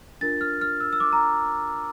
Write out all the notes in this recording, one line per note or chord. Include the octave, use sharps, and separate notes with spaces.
D4 F4 A#4 A6
F6
F6
E6
E6
D6
A#5